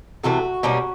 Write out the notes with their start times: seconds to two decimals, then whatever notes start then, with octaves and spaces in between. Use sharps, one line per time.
0.24 C3 E3 A3 F#4
0.63 B2 G3 A#3 C#4